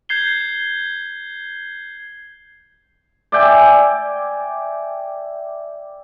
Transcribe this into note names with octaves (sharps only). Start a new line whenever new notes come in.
G6 G#6 C7 G7
D5 E5 G5 G#5